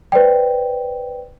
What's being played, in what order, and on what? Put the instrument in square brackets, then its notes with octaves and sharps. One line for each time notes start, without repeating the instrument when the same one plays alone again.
[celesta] B4 C5 D5 G5